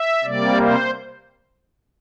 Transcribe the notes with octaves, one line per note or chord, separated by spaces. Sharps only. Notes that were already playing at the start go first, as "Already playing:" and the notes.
Already playing: E5
C3 G3 A#3 D5
C5